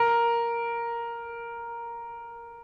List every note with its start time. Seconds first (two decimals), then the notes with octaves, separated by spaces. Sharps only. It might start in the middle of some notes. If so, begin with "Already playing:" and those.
Already playing: A#4